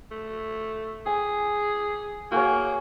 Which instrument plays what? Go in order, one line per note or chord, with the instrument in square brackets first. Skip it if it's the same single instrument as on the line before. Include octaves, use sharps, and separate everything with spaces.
[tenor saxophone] A3
[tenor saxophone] G#4 [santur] G#5
[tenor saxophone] A#3 [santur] F#4 G#4 C#5